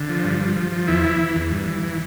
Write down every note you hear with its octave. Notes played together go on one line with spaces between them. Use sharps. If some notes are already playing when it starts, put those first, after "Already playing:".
Already playing: D3
F3
G2
F3
F3
F3
E2 E4
E3
E3
E2
G2
E3
E3